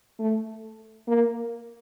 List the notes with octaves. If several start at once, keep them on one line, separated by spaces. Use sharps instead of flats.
A3
A#3